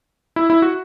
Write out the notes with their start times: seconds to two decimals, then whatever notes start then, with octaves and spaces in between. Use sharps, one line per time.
0.36 E4
0.50 E4
0.62 F#4